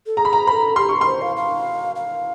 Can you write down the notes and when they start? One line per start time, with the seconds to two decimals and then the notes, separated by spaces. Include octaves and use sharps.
0.06 A4
0.17 G#4 A#5
0.25 B5
0.33 A#5
0.47 A4 C5 B5
0.76 G4 C6
0.89 C#6
1.01 C6
1.06 C5
1.21 F5
1.36 F5
1.96 F5